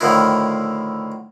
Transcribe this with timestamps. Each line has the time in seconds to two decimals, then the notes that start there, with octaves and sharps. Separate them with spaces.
0.01 A2 D3 D#3 F3 E4